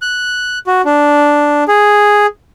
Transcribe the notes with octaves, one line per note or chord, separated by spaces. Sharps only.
F#6
F#4
D4
G#4